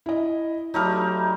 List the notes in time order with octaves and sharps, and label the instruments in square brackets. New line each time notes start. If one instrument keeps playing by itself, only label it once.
[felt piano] E4 D#5
[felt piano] F#3 F6 [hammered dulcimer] G3 A3 D#4